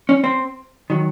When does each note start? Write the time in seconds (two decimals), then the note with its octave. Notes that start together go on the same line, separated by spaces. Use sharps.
0.09 C#4
0.24 C4
0.90 D#3 F#3